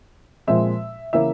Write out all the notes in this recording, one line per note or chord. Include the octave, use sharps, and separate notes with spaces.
A#2 F3 G#3 C4 E5
C#3 E3 A#3 C#4 E5